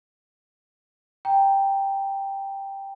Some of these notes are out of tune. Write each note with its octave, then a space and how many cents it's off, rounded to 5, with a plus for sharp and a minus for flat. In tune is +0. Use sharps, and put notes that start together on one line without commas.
G5 +0 A#5 +0